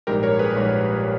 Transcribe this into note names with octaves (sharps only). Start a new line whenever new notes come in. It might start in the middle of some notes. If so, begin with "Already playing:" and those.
A#1 G#2 G3 G4 A#4
A#4 C#5
G#4 B4
A#1 G#2 G3